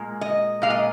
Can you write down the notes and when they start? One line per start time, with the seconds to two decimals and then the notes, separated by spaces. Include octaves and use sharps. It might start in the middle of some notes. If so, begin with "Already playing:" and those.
Already playing: A#2 G#3
0.21 D#5
0.62 A#2 G#3 F5
0.70 D#5